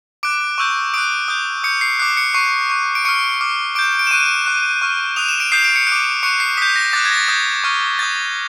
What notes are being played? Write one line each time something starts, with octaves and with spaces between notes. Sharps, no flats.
D6 F#6 D7
C#6 E6 G6
D#6 F#6 D7
D#6 G6
D#6 G6 C#7
C7
D6 F#6 C7
C#7
C#6 F#6 C7
C#6 F#6
D7
C#6 F6 C#7
D6 F6
D6 G6 D7
D7
E7
C#6 F#6 D#7
D6 F#6
C#6 F6
D#6 F#6 F7
E7
D7
D#6 G6 C7
D7
C#7
F#6 D7
D6
C#6 F#6 C#7
C7
D#6 G6 B6
A#6
D6 F#6 A6
G#6
A#6
A6
D#6 G6 G#6
C#6 F6
D#6 G6 A6